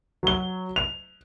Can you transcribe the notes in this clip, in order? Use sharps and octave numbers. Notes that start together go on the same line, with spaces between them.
F#3 G7
F7